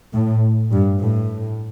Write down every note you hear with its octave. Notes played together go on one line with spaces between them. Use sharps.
A2
G2
A2